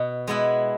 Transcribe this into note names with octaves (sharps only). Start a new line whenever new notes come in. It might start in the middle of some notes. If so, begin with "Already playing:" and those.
Already playing: B2
G#3 B3 E4